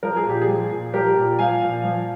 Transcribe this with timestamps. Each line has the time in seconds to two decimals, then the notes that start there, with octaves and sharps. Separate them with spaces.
0.03 F3 A#4
0.17 G#4
0.26 A#2 G4
0.42 G#4
0.48 F3
0.71 A#2
0.94 F3 G4 A#4
1.16 A#2
1.39 F3 F5 G#5
1.62 A#2
1.84 F3